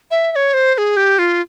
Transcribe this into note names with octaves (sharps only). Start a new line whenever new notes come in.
E5
E5
C#5
C5
C5
G#4
G4
F4